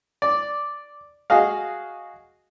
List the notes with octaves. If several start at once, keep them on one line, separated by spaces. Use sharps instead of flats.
D5
F#4 G#4 D#5 F5